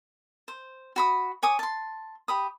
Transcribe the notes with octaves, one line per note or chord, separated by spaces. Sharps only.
C5
F#4 B5 D#6
C#5 G#5 D6 D#6
A5 C6
G4 B5 D#6